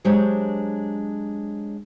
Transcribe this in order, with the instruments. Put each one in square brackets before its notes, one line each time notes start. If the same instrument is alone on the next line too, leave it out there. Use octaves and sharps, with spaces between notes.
[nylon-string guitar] F#3 G#3 D4 G4 C5 C#5